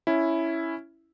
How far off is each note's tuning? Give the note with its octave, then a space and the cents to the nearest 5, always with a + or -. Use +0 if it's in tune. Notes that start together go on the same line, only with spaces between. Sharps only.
C#4 +0 E4 +0